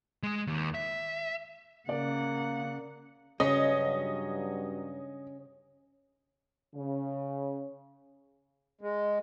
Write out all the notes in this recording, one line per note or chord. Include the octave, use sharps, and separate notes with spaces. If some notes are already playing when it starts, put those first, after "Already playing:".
G#3
D#2
E5
C#3 A#3 D5 F#5
G2 C#3 F#3 C#4 D#5
C#3
G#3